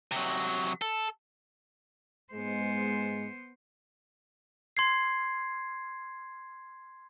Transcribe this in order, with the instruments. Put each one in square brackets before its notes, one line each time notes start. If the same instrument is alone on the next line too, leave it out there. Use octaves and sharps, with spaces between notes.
[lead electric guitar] C3 F#3
A4
[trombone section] G#2 G#3 [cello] B3 C5
[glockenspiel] C6 G#6 C7